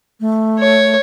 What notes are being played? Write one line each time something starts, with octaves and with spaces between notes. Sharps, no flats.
A3
C#5